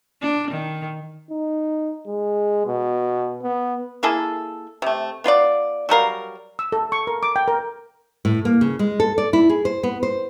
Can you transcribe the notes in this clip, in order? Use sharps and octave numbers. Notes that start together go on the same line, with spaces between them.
D4
D#3
D#4
G#3
B2
B3
A#3 E4 G#4 A4
C3 A3
B3 F4 A#4 D5
F#3 G3 A#4 F5
E6
A4
C#6
A#4
D6
G5
A#4
A2
A#3
C#3
G#3
A4
D5
E4
G#4
C5
B3
C5